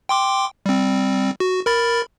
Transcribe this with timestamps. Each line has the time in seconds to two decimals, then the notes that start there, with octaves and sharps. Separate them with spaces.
0.09 G5 C6 D6
0.66 G3 C4
1.40 F#4
1.66 A#4 B5 A6